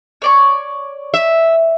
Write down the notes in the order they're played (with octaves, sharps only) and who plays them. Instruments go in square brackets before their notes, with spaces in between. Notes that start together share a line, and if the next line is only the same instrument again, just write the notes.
[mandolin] C#5 D5 C#6
[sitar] E5